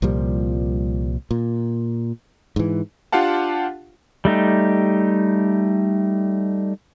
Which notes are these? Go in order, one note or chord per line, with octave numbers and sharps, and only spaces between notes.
C2 A#2 F3 G3
A#2
G#2 E3
D4 F4 G4 F5 F#5 A5
G3 A3 D#4 G4